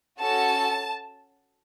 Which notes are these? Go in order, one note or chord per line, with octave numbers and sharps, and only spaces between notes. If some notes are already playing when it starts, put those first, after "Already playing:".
C#4 F#4 A4 A5